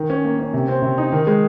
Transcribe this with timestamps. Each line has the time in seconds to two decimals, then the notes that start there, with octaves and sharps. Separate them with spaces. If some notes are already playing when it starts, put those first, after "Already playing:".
Already playing: D#3
0.10 C#4
0.24 A#3
0.39 C#4
0.53 C3
0.68 C4
0.82 C3
0.98 D#4
1.12 D#3
1.27 G#3